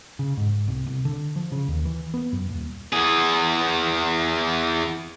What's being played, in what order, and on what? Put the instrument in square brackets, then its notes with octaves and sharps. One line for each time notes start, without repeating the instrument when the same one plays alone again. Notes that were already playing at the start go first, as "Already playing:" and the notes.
[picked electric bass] C#3
G#2
C2
C2
D3
F3
C#3
D#2
E3
B3
F#2
D#1
[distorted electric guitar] E2 G#4